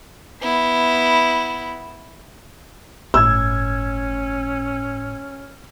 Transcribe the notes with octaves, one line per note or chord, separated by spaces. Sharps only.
B3 E4
G1 A2 C#4 E6 G#6